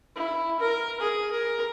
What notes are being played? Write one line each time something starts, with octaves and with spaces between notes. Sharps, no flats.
E4
A#4
G#4
A#4